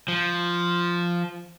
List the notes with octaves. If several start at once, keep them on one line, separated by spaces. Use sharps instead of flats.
F3